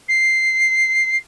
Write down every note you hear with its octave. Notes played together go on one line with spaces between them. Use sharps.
C7